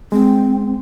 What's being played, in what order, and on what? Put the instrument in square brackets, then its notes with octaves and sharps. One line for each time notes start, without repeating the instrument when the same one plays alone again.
[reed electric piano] G#3 [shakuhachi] C4